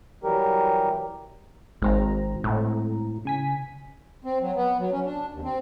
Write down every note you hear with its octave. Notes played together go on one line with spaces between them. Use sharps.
E3 F#3 G3 G4 A#4
G#1 G#2 C4 A#5
A2
C#3 G#5 B6
C4
F#3
B3
F#3
C#4
D4
D#2
C4